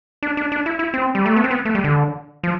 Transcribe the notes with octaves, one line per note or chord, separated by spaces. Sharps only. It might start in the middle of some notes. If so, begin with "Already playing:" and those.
D4
D4
D4
E4
E4
C4
G3
A3
B3
C4
B3
A3
G3
D3
F3